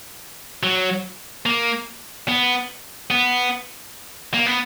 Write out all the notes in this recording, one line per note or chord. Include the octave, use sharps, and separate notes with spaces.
F#3
A#3
B3
B3
A#3
B3